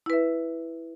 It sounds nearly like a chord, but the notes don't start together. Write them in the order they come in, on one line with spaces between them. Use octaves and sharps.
E4 B4 E5